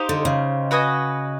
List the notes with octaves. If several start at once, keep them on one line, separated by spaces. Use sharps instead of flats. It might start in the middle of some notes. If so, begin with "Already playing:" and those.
Already playing: D#4 G4 C5 F5
D3
C#3
F#4 B4 D#5 G#5